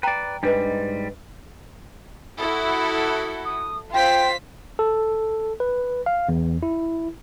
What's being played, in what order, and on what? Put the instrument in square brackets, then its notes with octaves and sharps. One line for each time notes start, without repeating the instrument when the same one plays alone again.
[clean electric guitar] B4 D5 [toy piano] G5 A#5
[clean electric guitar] G#2 G3 [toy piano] D4 B4 D#5
[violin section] E4 F#4 A4 [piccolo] D#6
[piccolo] D#6
[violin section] F4 C5 B6 [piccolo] G5
[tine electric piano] A4
B4
F5
E2
E4